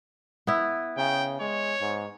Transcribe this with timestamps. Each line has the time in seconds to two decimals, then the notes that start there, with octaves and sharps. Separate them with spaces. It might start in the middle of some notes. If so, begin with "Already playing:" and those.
0.47 B3 E4
0.98 C#3 G5
1.41 G#3 C#5
1.81 G#2